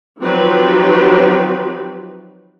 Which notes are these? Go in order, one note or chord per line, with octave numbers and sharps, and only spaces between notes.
D#3 F3 F#3 C4 G4 B4